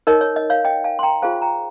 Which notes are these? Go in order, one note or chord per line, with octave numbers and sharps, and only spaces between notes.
D#4 A#4 C#5 D#5
C#5
D#5
C#5 F5
D#5 G5
F5 G#5
C6
G5 A#5
F4 G#4 C5 F5 G#5
G5 A#5